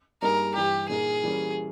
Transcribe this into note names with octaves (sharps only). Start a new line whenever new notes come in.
G2 G3 A#3 D#4 G#4 A#4
G2 E3 G3 G4
A#2 A#3 D#4 G#4 A#4
E3 G3 A#3 C#4